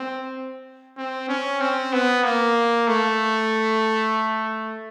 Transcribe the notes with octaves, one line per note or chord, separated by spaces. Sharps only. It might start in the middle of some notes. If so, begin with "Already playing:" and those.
Already playing: C4
C4
C#4
C4
B3
A#3
A3